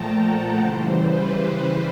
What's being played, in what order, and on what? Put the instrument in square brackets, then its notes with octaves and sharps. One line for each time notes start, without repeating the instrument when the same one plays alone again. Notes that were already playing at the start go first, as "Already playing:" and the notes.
Already playing: [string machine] A#2 F3 A3 G5 A5 A#5
F#5
C#3 E3 G3 C5
B4